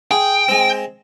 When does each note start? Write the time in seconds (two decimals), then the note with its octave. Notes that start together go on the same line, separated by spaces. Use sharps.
0.11 G#4 G5
0.49 G#3 C4